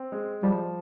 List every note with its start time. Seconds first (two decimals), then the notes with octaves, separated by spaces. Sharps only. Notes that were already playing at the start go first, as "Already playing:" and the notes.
Already playing: C4
0.12 G#3
0.43 F3 G3